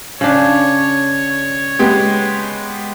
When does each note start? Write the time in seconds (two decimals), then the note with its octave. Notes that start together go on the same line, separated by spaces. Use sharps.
0.21 C#3 D4 C#5
1.79 G#3 B3 G4